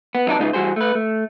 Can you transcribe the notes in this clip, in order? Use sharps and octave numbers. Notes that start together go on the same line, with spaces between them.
B3
F#2 C3 D#4 B4 D5 A5
C#3 G#3 D#4 F4 B4
E3 G3 F#4 G#4 C5
A3 B4
A3